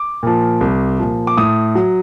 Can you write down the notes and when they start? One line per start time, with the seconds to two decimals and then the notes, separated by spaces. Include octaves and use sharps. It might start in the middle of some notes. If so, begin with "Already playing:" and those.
Already playing: D6
0.23 A#2 F3
0.61 C2
0.99 A#2 F3
1.27 D6
1.38 A2 D#6
1.75 F#3